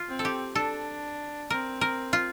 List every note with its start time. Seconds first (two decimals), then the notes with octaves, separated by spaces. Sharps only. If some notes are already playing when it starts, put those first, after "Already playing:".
Already playing: F4
0.08 C4
0.19 A4
0.25 G4
0.55 D4 A4
1.50 C4 A#4
1.81 A#4
2.13 F4